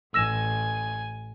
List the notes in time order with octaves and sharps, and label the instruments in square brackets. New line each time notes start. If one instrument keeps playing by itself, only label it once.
[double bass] A1 [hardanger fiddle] G#5 [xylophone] E6 A#6 E7